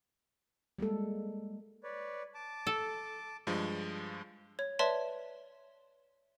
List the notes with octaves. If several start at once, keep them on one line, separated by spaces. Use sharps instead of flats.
G3 G#3 A#3 A4
B4 C#5 D5
A5 D6
A4
G2 F3 G#3
C#5
B4 C#5 D5 E5 A5 C6